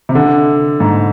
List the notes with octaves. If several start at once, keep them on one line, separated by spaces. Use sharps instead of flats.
C3
D3
G#2